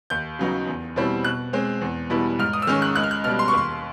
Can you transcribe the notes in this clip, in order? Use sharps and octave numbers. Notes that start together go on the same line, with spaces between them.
D#2 G6
C#3 F#3 B3 D#4
E2
B2 G3 C4 E4
B2 F#6
G#3 C4
E2
B2 G3 B3 E4
G#2 F6
D#6
E6
D#3 G#3 C#4 F6
F#6
C#2 F#6
F6
F#6
B2 G3 F6
C6
C#6
D#2 C6